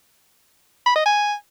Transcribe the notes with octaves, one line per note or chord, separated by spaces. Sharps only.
B5
D#5
G#5